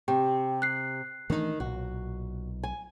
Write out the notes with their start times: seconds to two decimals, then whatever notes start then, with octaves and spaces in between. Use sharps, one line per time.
0.08 C3 G4 G5
0.62 F#6 C7
1.30 D#3 E3 A3 D4 D#4
1.60 B1 A#2 F#4
2.63 G#5